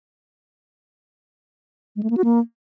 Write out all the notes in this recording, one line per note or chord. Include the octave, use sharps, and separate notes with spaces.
G#3
A3
A#3
F#4
A#3